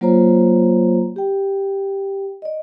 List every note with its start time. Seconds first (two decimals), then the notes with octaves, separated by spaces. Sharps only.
0.01 F#3 A#3 F4 C5 C#5 A#5
1.16 G4 G5
2.42 D5 D#5